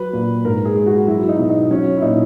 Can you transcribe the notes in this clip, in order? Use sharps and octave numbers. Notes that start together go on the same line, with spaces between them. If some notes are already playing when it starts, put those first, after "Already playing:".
Already playing: F#3 B4
A#2
G#2 A#4
G#4
G#3
F#4
F#3 E4
D#4
B2
D#4
F#3 C#4
E4
A#2 D#4